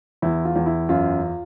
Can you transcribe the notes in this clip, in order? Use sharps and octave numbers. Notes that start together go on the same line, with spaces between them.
E2 E4
F4
E2
E4
F#2 F4